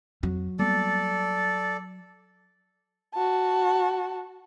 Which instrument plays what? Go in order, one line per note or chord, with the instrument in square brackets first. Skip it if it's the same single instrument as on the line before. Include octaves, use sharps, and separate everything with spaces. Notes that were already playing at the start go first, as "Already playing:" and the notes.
[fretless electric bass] F2 [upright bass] F#3
[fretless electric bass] G3 A#3 B3 [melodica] A4 D5
[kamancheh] F#4 A5